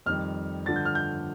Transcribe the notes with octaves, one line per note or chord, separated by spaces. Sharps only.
F2 D#3 G3 F6
G2 D3 F3 A6
G6
F6
G6